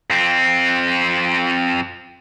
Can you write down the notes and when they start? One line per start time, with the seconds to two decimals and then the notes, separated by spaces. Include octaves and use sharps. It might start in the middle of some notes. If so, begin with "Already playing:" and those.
0.10 F2 C4